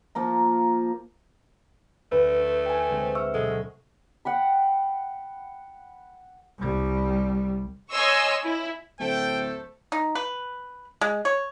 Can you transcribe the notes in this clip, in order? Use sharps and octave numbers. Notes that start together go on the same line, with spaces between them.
F3 A#3 A#5
D2 A3 B4
G5 G#5
D3 G#3 C4
E5 C#6 E6 F6
B2 F#3 G#3 A4
F#5 G5 B5
C2 G3
C#5 D#5 G#5 C6 C#6 E6
E4
D1 A3 A4 C5 G5
D#4
B4
G#3
C#5